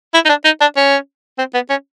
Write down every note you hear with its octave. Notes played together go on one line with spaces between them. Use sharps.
E4
D#4
D4
D#4
D4
C#4
C4
B3
C#4